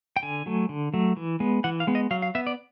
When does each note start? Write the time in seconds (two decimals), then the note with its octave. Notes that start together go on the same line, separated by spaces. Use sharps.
0.17 G5
0.23 D3 G#5
0.46 F#3 A3
0.69 D3
0.94 F#3 A3
1.17 E3
1.40 G#3 B3
1.64 E3 F#5
1.80 F5
1.87 G#3 B3
1.95 D#5
2.11 F#3 F5
2.22 F5
2.35 B3 E5
2.47 D5